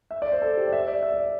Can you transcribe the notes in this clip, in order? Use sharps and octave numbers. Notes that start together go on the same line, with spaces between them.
E5
D5
C5
A4
G4
D5
E5
D5
E5
D5